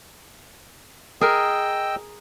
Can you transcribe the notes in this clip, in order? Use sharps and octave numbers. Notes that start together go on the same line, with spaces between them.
G#4 A#4 D#5 G5 E6